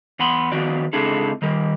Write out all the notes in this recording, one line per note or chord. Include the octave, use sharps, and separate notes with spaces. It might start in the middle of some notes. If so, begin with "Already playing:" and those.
E2 B3 F#5 B5 C6
D#3 F3 B3 F#4 D5
C#2 C4 D4 E4 G#4 A4
D#3 G3 A#4